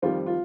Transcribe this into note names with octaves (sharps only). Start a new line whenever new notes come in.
F2 D#3 G3 C4 F4
F4